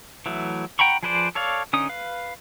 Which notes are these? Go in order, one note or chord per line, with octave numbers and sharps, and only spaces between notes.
E3 F#3 A3
F#5 G5 A#5 B5 C#6
F3 G#4 B4 C5 D5
A4 C#5 D5 F5
D3 C#4 D#4 D#6
B4 F5